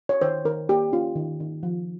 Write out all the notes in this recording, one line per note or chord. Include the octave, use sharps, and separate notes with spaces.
C#5
D#3 C5
D#3 A#4
A#3 G4
C#4 F4
D#3
D#3
F3